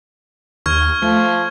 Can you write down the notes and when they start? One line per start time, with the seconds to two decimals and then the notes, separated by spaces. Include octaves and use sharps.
0.66 D#2 C#6 F6 G#6
1.02 F3 A3